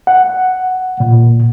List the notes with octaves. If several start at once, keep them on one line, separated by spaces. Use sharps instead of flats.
F#5
A#2